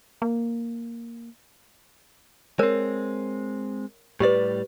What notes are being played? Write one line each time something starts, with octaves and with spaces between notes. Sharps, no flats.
A#3
G#3 C4 A#4 C#5
A2 G3 G4 B4 D5